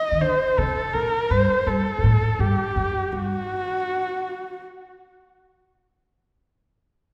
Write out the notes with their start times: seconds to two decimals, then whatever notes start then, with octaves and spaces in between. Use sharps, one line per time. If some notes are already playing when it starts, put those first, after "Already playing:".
Already playing: D#5
0.12 D#3
0.21 D3 C5
0.58 C3 A4
0.93 A#2 A#4
1.31 G2 C5
1.66 G2 A4
1.98 G2
2.03 A2
2.39 G2 G4
2.76 F#2
3.12 G2 F#4